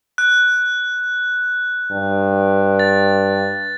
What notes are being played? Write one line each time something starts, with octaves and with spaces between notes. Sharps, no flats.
F#6
G2
A6